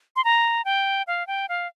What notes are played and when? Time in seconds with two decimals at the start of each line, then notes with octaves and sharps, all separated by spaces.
0.16 C6
0.24 A#5
0.65 G5
1.07 F5
1.27 G5
1.49 F5